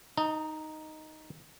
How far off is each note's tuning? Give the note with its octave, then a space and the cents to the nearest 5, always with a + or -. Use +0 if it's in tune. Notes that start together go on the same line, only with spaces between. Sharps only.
D#4 +0 A#5 -45